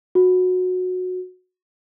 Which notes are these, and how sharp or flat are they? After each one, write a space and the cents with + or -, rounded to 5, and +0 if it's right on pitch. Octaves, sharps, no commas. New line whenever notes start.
F#4 -15